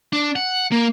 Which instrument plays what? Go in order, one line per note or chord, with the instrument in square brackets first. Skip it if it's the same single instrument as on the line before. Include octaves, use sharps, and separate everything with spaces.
[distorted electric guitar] D4
F#5
A#3